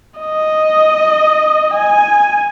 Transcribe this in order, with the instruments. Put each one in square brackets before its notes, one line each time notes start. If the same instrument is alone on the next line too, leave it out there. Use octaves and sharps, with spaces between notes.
[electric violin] D#5
G#5